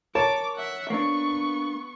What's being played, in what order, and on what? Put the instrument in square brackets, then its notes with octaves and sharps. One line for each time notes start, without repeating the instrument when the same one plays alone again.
[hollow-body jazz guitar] A#4 [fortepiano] C#5 A5 [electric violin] D6
[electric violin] E5 F#5
[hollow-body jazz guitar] A#3 D4 [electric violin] B3 C#6